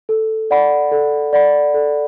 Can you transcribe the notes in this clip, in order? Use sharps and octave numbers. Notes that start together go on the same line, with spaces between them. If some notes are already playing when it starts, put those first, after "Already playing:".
A4
D5 F#5 B5
A4
D5 F#5 B5
A4